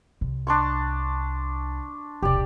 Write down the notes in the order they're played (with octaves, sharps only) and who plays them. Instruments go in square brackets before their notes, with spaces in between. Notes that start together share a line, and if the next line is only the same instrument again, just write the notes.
[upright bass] C2
[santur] D4 C6 C#6
[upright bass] E1 C2 [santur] G4 D5